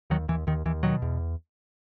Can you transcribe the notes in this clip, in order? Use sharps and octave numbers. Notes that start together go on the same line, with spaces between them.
D#2 D#3 F#3
D#2 E3
D#2 D#3
D#2 E3
B2 D#3 F#3
E2